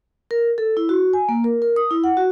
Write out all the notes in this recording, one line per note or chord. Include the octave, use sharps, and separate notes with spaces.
A#4
A4
E4
F#4
G#5
A#3
A#4
A#4
D#6
E4
F#5
F#4